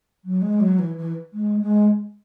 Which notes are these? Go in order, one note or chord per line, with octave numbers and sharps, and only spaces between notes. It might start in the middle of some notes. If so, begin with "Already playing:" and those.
F#3
G#3
F#3
E3
E3
G#3
G#3